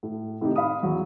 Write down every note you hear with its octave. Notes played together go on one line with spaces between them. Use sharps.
A2
A2 C3 D#3 D#4 G4
F5 B5 D#6
E2 F#3